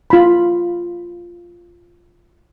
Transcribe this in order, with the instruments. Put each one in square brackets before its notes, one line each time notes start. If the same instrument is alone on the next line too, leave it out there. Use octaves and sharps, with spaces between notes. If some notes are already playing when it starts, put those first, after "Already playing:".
[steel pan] F4 B5